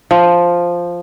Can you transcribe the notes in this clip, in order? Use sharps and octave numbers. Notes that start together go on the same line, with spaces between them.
F3